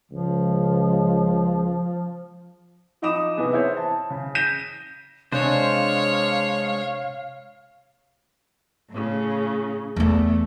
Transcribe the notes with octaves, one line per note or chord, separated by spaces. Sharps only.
C#2 F3
F3 D#4 B5 D6 D#6 E7
C3 E3 B3 G#4
E4 C5 C#5
A5
C#3
G6 A#6 B6 D#7 E7
C3 G#3 D4 C5 C#5 F5
A2 C#3
E2 A3 B3